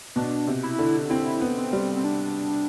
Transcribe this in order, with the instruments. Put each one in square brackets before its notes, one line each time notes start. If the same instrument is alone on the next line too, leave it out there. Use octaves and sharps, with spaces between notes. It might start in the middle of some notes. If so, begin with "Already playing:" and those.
[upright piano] B2 [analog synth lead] D4
[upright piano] C3
[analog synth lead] E4
[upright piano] D3
[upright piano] C4 [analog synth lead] E4
[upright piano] B3
[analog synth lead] C4
[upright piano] G3
[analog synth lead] C4
D4